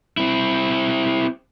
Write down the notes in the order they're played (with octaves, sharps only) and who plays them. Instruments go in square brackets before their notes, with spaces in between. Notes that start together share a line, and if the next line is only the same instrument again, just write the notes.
[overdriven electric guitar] C4 E4